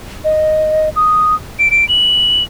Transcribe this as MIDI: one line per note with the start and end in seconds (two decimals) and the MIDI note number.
0.24 0.89 75
0.96 1.34 87
1.59 1.71 98
1.71 1.87 98
1.89 2.43 102